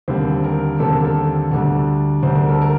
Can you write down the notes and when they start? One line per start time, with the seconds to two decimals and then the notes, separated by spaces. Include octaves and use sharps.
0.08 D#2 D3 G3 C4 C5
0.44 A#4
0.79 D#2 D3 G3 C4 A4
0.93 A#4
1.05 A4
1.51 D2 D3 G3
2.23 D2 D3 G3 C5
2.35 A#4
2.49 A4
2.62 A#4